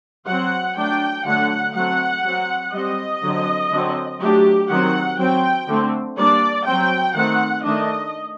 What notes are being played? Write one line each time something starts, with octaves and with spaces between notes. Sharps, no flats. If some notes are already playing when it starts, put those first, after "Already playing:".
F#3 C4 F#5
F#3 A3 D4 G5
D3 F#3 A3 F#5
F#3 A3 C4 F#5
F#3 C4
G3 C4 D#5
D3 F#3 C4
D3 F#3 C4
F#3 A3 D4 G4
D#3 F#3 C4 F#5
F#3 C4 G5
D3 A3 C4
G3 A#3 D4 D5
F#3 C4 G5
D#3 A3 C4 F#5
D#3 A3 D4 D#5